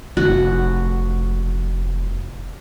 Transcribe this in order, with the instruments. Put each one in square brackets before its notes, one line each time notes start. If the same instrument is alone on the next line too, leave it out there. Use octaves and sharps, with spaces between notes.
[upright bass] F1 [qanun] F#4